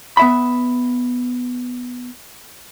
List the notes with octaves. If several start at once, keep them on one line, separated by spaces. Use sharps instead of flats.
B3 E5 B5